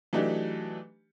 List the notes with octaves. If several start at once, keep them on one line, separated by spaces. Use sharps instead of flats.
E3 F#3 A3 D4 D#4 G4